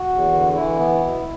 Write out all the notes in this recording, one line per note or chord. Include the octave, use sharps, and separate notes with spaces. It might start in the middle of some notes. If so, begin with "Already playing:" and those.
Already playing: F#4
E2
D3
E3 E4
B3
B2